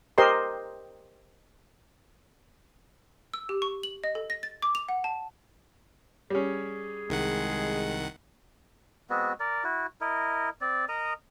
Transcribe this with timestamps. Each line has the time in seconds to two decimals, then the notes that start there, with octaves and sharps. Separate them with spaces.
0.18 G4 A#4 C5 D#5 C6
3.34 E6
3.49 G4
3.62 C#6
3.83 F#7
4.04 D#5
4.15 A4
4.30 A#6
4.43 A6
4.62 D6
4.75 F7
4.89 F#5
5.04 A5
6.30 G3 C#4 G#4
7.09 C2 D#3 G#3 F#5
9.10 G#3 B3 C4 F#4
9.40 A#4 D5
9.64 E4 F#4
10.01 E4 A#4 D#5
10.61 C4 D5
10.89 A#4 D#5 A#5 D#6